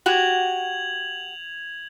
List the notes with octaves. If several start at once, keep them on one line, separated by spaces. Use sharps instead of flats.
F#4 G4 G#6 F7 F#7